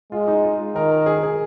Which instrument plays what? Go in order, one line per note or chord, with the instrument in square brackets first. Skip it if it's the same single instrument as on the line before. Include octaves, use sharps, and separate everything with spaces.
[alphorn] G#3 [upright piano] F4
[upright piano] D#4
F4
[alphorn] D#3 [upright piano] A#4
[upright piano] A#4
G#4
G#4